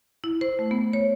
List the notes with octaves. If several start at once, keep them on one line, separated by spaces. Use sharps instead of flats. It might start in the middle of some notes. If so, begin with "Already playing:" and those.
E4
C5
A3
B3
C#5